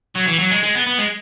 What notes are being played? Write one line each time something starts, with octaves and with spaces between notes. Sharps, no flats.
F#3
E3
F#3
G#3
G#3
B3
B3
G#3